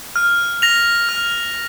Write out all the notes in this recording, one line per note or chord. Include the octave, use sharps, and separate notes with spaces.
F6
A#6 F7
F6